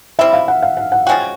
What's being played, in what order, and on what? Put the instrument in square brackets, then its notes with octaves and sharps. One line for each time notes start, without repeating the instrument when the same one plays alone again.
[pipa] G3 C4 E4 [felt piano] E5
[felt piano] F5
F#5
F5
F#5
F#5
[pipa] F3 G#3 C#4 F#4 [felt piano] G5